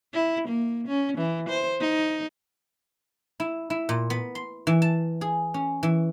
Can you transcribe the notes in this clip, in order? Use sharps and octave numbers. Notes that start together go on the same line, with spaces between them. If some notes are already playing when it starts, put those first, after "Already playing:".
E4
A#3
C#4
E3
C5
D#4
E4
E4
A#2
B3
C6
E3
A5
G#4
C#4
E3